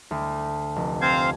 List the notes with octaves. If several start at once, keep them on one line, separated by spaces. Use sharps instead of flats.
D2
F1
C4 C5 F5 G#6